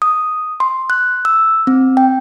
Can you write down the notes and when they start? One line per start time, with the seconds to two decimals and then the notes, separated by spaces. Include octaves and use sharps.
0.02 D#6
0.60 C6
0.90 F#6
1.25 E6
1.67 C4
1.97 G5